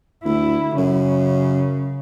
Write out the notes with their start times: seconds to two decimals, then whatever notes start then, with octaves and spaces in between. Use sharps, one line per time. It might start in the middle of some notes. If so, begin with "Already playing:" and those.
0.25 D2 E4
0.77 F#2 C#3